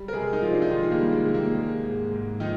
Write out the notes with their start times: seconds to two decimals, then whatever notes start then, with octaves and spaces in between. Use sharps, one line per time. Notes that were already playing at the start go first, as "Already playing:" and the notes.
Already playing: G3
0.08 A#4
0.13 C3 G#3 G#4
0.33 D#4
0.42 C3 F3 F4
0.53 D4
0.62 D#4
0.70 D#3 F3 F4
0.83 G#3
0.91 A#3
0.98 G3
1.13 G#3
1.26 C3
1.34 A#3
1.55 G#3
1.83 G#2
2.12 G#2
2.40 D#3 F3 D#4